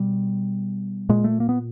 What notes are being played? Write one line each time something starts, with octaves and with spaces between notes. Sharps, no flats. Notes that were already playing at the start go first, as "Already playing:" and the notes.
Already playing: B2 G3
A#2 G#3
A3
A#3
B3